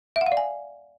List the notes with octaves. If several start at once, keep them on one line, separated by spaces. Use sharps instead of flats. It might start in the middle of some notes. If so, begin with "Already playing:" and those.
E5
F#5
F5
D5
G#5